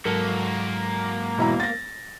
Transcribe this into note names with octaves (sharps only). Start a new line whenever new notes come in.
G#2 F#3 A#3 F#4 A4 A#4
E1 E4 A#5
A6 A#6